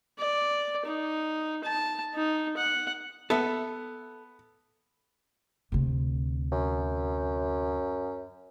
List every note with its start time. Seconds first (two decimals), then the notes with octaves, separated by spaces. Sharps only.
0.19 D5
0.85 D#4
1.63 A5
2.14 D#4
2.57 F#5
3.30 B3 A4 E5
5.72 D2 C3
6.52 F#2